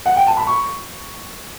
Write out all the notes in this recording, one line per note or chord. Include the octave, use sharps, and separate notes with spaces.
F#5
G5
A5
B5
C#6